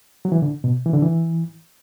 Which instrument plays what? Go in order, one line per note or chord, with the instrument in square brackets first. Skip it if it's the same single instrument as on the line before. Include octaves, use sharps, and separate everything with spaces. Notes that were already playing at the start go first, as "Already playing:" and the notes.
[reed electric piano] F#3
E3
D3
B2
E3
D3
E3